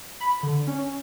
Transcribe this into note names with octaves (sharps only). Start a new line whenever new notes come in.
B5
D3
C#4